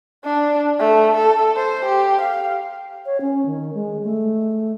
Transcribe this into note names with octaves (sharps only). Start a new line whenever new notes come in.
D4
A3
A4
C5
G4
F5
C#5
C#4
D#3
G#3
A3